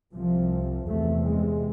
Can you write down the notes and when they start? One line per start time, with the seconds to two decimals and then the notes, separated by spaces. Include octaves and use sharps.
0.13 C2 C3 F3
0.87 E2 C3 A3
1.24 G#3